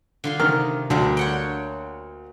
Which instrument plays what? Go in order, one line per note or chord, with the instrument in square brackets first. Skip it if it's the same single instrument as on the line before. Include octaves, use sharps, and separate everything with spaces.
[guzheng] D3 F4 C6
[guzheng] C3 [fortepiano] D#3 F6
[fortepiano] D2 [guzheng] D3 G3 A#3
[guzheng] C#5 F#5 G5